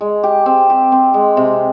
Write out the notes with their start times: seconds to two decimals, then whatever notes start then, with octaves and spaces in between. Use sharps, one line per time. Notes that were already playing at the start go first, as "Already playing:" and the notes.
0.01 G#3
0.23 G4
0.46 C4
0.70 G4
0.92 C4
1.14 G#3
1.37 C3